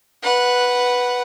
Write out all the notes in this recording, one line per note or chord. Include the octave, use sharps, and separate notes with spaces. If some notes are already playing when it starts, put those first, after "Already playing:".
B4 F#5